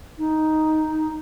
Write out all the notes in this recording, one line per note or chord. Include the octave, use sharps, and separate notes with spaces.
D#4